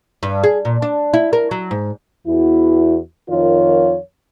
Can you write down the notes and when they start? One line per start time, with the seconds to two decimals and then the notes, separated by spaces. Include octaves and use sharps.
0.23 G2
0.43 G#4
0.65 A#2
0.82 D4
1.14 E4
1.33 A#4
1.51 F#3
1.71 G#2
2.27 E2 E4 F#4
3.30 F2 D#3 F4 A#4 C#5